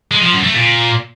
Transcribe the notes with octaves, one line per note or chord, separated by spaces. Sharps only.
G#3
F3
F#2
A3
A#2